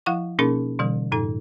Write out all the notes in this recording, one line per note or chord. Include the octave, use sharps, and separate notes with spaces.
F3 E4 F5 F#5 C#6
B2 A#3 C#4 D#4 G#4 A#4
B2 D3 E3 G3
F#2 A2 D#4 A4